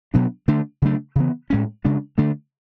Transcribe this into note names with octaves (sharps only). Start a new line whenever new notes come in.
B2 F#3 B3 D4
D3 A3 D4
C#3 F#3 A3 D4
C#3 E3 B3
A2 G#3 C#4
C#3 G#3 D4
D3 A3 D4